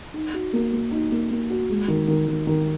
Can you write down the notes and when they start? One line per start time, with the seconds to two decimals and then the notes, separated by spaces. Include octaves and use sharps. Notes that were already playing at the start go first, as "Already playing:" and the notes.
0.14 D#4
0.34 F#4
0.53 A#3
0.72 A#3
0.91 D#4
1.12 A#3
1.30 A#3
1.50 F#4
1.70 G#3
1.88 D#3
2.08 D#3
2.28 D#3
2.47 D#3